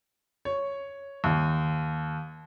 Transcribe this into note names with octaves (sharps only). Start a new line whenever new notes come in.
C#5
D#2